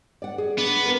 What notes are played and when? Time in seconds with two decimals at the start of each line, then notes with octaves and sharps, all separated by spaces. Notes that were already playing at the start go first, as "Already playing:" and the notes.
0.22 D5 F#5
0.38 G#4
0.58 B3 D4
0.85 A#4 B4